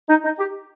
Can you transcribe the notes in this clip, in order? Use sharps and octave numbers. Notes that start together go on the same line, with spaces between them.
D#4
D#4
G4